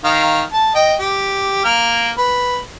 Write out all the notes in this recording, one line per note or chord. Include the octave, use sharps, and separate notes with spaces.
D#3 F5
A5
D#5 G5
G4
A#3 F6
B4